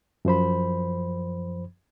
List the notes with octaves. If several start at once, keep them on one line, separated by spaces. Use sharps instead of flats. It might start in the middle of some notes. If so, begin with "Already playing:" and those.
F#2 F3 C5 B5